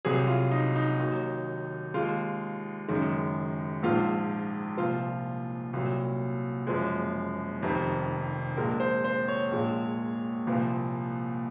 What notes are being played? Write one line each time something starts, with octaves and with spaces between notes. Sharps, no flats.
C2 C3 F#3 G#4
F4
D#4
D#4
D#2 D#3 F#3
D#2 D#3 G#3 F4
F#1 F#2 D#3 G#3
A#1 G#2 F3 F4
C2 A#2 F3 F4
C2 A#2 F#3
F#1 F#2 F3 G#3
F1 F2 C3 D#3
A#1 A#2 G#3 A#4
C5
C5
C#5
A#1 A#2 G#3
C2 A#2 F3